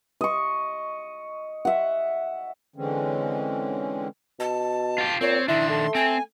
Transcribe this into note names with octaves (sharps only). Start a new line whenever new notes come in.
D#5 C#6
E5 F#5
D3 E3 G#3 C4 C#4
B2 A5
F4 G4
A#2 C4 C#5
D#3 D4 E4 C6
A3
C4 G5 G#5